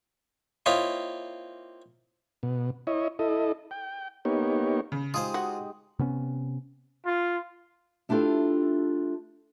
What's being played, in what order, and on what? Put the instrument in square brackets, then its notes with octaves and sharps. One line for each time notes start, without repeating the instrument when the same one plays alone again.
[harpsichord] A#3 C4 E4 F4 C#5 D#5
[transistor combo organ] B2
E4 C#5 D#5
E4 A4 D#5
G5
A#3 B3 D#4 G4 C#5
[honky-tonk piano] C#3
[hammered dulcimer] G#3 D#4 G4 [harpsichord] F4 G#4 C5 [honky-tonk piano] D#6
[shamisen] F#4
[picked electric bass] C3 B3 C#4
[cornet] F4
[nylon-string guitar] A3 D4 E4 F4 G4 A4